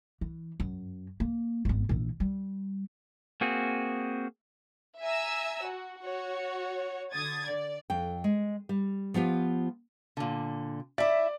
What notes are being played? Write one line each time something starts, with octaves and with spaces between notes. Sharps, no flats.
E3
F#2
A#3
G#1 B3
A#1 E3
G3
A#3 C4 F#4 G#4
E5 G#5 A#5 E6
F#4
F#4 C#5
D3 D#6 G#6 A6
D5
F2 G5
G#3
G3
F3 B3 F4 G4
A#2 D3
E4 D5 E5